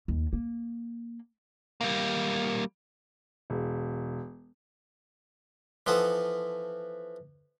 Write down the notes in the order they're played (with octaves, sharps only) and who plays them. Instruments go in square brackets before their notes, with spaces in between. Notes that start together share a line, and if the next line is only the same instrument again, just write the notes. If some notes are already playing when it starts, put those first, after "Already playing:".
[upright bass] D#2
A#3
[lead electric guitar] G3 A#3
[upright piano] E1
[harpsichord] E3 F3 B3 A4